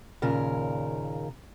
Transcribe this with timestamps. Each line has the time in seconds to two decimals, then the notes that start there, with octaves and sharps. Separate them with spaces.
0.22 D#2 A#2 C#3 A#4